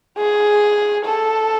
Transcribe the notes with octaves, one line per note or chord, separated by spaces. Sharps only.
G#4
A4